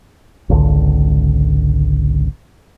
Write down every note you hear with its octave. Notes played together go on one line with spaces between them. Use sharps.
G#1 C#2 D3